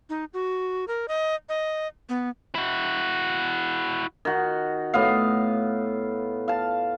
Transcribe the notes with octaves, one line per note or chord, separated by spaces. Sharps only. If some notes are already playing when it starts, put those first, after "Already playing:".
D#4
F#4
A#4
D#5
D#5
B3
E4 F#4
D#3 F#4
A2 B3 F5
F5 A5